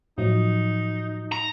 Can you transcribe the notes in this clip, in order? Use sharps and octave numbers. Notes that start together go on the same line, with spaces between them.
A2 F3 F#3 D#4
A#5